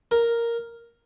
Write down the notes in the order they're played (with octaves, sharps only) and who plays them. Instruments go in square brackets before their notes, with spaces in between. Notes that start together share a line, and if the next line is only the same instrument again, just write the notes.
[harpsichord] A#4